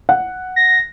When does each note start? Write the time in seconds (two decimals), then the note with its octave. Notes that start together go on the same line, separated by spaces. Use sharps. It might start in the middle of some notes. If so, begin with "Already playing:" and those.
0.09 F#5
0.56 A#6